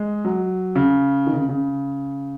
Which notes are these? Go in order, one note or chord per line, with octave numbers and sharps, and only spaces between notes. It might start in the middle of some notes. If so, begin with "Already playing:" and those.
Already playing: G#3
F#3
C#3
D#3
C#3
C#3